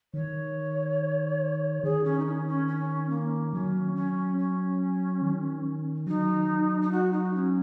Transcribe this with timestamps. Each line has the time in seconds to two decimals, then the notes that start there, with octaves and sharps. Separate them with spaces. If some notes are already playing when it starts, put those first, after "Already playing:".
0.14 D#3 C#5
1.83 D#3 G#4
2.04 C#4
2.19 D#4
2.26 C#4
2.47 C#4
2.67 C#4
3.10 A#3
3.53 F#3 C#4
3.95 C#4
4.37 C#4
5.22 D#3
6.07 F#3 D#4
6.82 D#4
6.91 F#4
7.13 D#4
7.34 C#4